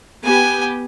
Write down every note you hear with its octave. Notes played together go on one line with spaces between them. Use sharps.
B3 G4 G#5